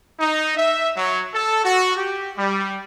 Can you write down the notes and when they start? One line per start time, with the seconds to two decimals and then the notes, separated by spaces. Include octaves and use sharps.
0.20 D#4
0.57 E5
0.97 F#3
1.34 A4
1.64 F#4
1.96 G4
2.38 G3